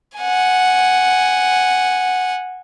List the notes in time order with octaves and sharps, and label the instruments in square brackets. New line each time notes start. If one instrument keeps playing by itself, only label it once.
[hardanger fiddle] F#5 G#5